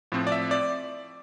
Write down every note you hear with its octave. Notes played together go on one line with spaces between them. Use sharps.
A2 F3 C4
D5
E5
D5